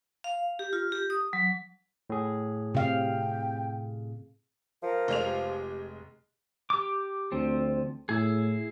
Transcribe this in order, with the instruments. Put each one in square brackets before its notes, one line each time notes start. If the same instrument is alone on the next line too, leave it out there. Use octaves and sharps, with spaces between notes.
[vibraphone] F5
G4
F4
G4
D#6
F#3
[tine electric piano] A2 G#4
[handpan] C3 F5 [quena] G5
[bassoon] F3 [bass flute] A#4
[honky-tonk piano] F1 G#3 F7
[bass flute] G4
[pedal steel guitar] G4 D6
[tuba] D2 [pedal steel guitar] F3 C4
[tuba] A2 [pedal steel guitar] E4 G#4